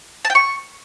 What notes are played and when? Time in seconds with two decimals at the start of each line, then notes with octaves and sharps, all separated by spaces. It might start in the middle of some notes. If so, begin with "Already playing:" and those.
0.25 A5
0.30 G5
0.35 C#6